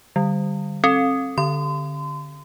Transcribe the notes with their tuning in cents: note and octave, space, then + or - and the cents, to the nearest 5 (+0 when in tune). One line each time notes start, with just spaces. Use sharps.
D3 +30 G3 +0
C4 +35 A4 +0
D3 +0 C6 -35